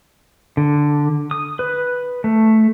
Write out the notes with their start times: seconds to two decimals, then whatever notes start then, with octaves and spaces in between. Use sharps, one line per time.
0.57 D3
1.31 D#6
1.59 B4
2.24 A3